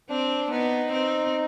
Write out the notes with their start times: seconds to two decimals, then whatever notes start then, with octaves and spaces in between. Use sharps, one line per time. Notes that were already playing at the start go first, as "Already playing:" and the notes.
0.09 C4 D4
0.52 B3 D#4
0.93 C4